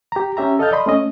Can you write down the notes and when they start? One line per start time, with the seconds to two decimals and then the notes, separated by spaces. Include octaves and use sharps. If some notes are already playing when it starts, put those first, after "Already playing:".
0.12 G4 A#5
0.37 C#4 G4 E5 A#5
0.59 A4 D#5 F5 A5 F6 G6
0.72 D5 D#5 B5 C6
0.86 A3 C#4 D#5